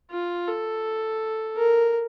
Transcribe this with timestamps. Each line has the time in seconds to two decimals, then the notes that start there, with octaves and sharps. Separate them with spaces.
0.11 F4
0.48 A4
1.56 A#4